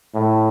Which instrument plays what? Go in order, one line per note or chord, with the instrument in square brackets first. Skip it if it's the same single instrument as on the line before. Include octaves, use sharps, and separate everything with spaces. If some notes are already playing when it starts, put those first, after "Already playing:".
[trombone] A2